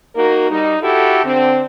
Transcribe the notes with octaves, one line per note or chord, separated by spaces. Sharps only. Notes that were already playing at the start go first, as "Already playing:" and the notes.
A#3 D#4 F#4 A#4
G3 D#4
E4 F#4 G4 A4
D3 C4